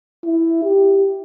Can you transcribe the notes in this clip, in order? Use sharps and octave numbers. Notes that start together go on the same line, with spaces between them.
E4
G4